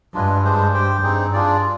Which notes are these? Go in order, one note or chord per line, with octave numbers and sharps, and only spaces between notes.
G2 D4 F4 B4 D#5 G#5
G#3 D4 G#4 C5
G4 C5 G5
G2 C4 D#4 G#4
G2 D4 F4 G#4 D5